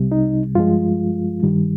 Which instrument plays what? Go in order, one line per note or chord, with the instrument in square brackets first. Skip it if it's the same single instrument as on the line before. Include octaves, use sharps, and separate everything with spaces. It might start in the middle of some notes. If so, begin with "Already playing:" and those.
Already playing: [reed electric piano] C2 C3 G3
D#4
G2 F3 G#3 F4
G2 D#3 G3